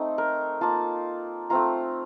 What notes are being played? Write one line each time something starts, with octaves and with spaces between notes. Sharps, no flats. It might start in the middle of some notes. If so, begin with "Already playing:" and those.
Already playing: A3 C4 D#4
A#4
A#3 F4 A5
A3 C4 F4 A#5